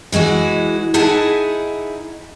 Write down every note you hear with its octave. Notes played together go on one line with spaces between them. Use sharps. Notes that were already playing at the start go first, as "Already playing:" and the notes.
E3 G#3 E4 F#4
D#4 E4 G#4 E5 F#5 A5